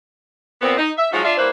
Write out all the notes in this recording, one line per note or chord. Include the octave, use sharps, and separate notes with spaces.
A#2 B3 C4
D#4
E5
F3 F#3 G#3 D#4 F4 F#4
D4 F4 E5
G3 A#3 E4 B4 C5